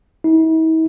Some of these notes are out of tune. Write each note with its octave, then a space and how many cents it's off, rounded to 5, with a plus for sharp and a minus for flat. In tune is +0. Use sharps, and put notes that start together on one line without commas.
E4 -45